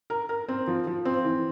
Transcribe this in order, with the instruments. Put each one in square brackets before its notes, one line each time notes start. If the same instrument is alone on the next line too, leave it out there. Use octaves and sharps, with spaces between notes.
[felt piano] A#4
A#4
C4
F3
F3
C4
E3